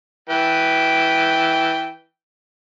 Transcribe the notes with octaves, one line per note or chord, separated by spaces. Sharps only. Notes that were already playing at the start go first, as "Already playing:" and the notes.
E3 B4 G5